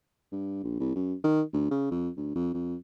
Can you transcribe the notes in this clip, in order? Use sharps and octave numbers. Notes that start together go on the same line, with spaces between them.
G2
A#1
C2
F#2
D#3
D2
C#3
F2
D2
F2
F2